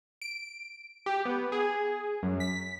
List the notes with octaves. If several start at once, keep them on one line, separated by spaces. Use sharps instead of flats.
D7
G4
B3
G#4
F#2
B6